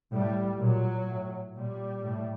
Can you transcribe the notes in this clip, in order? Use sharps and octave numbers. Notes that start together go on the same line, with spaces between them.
A2 G3
A#2 F#3
A2
A#2 G3
A2